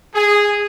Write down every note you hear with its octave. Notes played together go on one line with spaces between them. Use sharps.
G#4